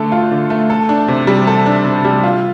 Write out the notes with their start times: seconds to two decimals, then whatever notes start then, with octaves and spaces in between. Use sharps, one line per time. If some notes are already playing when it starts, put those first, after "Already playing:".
Already playing: D3 A3 A4
0.12 F4
0.31 D3
0.50 A3
0.70 A4
0.89 D4
1.08 C3
1.27 G3
1.47 A4
1.66 D4
1.85 C3
2.05 G3
2.24 F4